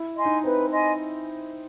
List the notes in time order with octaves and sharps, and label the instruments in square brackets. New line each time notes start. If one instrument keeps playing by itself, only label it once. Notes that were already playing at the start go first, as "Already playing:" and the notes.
Already playing: [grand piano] E4
[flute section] D#5 G#5 C6
[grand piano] D#4
[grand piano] C4 [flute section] B4
[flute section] D#5 G#5 C6